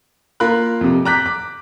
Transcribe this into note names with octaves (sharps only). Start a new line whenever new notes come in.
A#3 F4 A#4 F5 B5 F#6
F2 C3
A#5 D6 F#6 G6 B6
D6